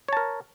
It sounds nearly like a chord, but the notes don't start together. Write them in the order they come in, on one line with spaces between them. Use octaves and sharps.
C#5 A5 A#4